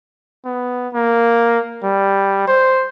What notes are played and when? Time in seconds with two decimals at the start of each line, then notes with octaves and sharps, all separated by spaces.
0.45 B3
0.94 A#3
1.83 G3
2.48 C5